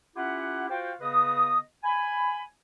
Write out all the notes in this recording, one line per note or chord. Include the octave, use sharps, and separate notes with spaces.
C#4 E4 F4 G4 E5 F#5
F4 F#4 C5 F5 G5
C#3 B3 B4 D#5 D#6
G#5 B5